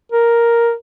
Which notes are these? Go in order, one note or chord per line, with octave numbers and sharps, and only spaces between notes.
A#4